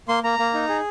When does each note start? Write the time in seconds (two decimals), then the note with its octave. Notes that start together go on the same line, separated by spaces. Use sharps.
0.08 A#3 C6
0.24 A#3 A#5
0.39 A#3
0.54 D#4
0.69 G#4